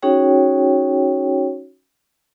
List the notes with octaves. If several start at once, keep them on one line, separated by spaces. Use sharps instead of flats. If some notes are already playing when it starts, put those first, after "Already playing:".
C#4 D#4 F#4 G#4 C#5 G5